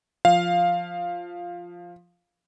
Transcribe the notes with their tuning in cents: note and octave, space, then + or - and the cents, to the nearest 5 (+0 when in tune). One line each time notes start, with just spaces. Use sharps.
F3 +0 F5 +0